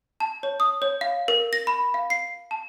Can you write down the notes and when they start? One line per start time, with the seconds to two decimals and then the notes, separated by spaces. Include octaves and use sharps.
0.20 A5
0.43 C#5
0.60 D#6
0.82 C#5
1.01 F5
1.28 A#4
1.53 A#6
1.67 B5
1.94 F5
2.10 C7
2.51 A5